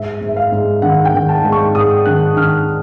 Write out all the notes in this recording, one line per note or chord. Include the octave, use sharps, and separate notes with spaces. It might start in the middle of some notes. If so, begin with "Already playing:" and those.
Already playing: G#2 E5
G#2
E5
F5
G#2
D#3 F#5
G5
D#3
A5
G#2
C#6
G#2 D#6
D#3 F#6
D#3 F6